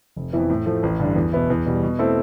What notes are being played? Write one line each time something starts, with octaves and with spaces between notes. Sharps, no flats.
F1
F2 E3 B3 E4
A2
F3 A3
A1
G2 D3
E2
B2 B3 E4
E2
B2 G3
B2
A3 C4 E4 A4